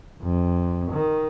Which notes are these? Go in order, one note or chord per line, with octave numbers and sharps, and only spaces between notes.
F2
D#3